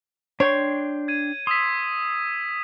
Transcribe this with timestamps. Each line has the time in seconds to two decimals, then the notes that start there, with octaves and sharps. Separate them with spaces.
0.40 D4 C#5 G5 C6
1.08 G#6 D#7
1.47 C6 D#6 E6 B6